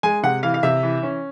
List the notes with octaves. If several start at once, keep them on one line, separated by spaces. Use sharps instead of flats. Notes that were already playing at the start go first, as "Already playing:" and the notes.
G#3 G#5
C3 F#5
E3 F5
F5
C3 E5
E3
C#4